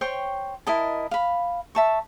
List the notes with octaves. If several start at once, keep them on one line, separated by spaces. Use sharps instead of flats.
C5 C#5 G5 C#6
E4 A#4 D#5 A5
F5 B5
E5 A5 C#6